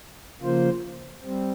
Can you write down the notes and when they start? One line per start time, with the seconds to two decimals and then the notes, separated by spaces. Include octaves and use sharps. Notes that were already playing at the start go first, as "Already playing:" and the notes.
0.40 C#3 F3 A#3 F4 C5
1.24 G3 C4